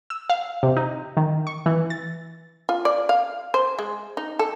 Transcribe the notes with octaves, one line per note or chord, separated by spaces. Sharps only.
E6
F5
C3
D#4
D#3
C#6
E3
A6
F4
D5
F5
C5
G#3
D#4
A4